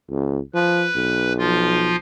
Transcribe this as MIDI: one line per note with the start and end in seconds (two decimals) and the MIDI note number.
0.10 0.39 37
0.54 0.87 53
0.54 1.33 71
0.96 1.98 35
1.38 1.96 53
1.38 1.96 65